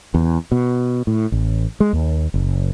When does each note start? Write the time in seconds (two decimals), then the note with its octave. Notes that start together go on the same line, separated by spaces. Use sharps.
0.14 E2
0.52 B2
1.07 A2
1.32 A1
1.80 G#3
1.93 D#2
2.34 F#1